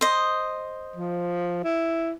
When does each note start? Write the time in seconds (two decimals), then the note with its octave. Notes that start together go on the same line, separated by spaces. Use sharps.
0.01 C5 D#5
0.96 F3
1.64 E4